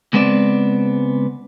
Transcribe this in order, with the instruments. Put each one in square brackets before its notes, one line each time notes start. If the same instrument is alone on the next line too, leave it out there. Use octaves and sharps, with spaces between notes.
[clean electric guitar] C#2 G#3 B3 C4 D5